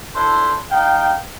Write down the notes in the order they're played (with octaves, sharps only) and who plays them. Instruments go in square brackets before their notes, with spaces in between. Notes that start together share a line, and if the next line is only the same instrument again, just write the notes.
[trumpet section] D4 E4 A4 C5
D#4 F5 G5